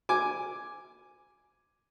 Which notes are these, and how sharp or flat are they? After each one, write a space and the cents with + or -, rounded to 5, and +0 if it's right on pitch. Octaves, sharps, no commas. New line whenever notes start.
G#5 +0 D6 +0